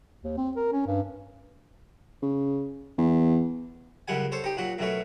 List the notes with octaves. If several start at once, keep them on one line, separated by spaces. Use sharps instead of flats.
D#2
C4
A#4
C#4
G2
C#3
E2
C#2 F#2 G3 F#5 G#5
A4 C5 C#5
D#4 G4
A#2 F#3 F#4
F#2 B2 A3 C#4